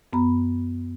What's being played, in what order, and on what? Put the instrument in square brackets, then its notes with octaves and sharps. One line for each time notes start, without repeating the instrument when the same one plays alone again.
[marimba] F#2 B3 A#5 B5